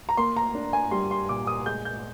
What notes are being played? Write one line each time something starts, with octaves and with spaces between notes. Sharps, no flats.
A#5
A#3 C6
A#5
D4
G#5
G3 C6
C6
A#2 D6
D#6
G#3 G6
G6